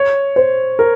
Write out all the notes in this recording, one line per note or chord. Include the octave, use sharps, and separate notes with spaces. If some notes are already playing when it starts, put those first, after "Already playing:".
Already playing: C#5
C5
A#4